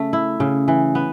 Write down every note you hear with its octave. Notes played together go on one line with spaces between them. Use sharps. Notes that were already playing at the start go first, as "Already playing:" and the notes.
Already playing: C#3 A3
E4
C#3
E3
B3